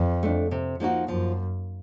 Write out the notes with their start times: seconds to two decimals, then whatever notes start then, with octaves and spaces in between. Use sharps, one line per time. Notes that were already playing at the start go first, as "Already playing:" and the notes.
Already playing: F2
0.23 A3 D4
0.51 C3
0.80 F3 A#3 D#4 F#4
1.08 F#2 F3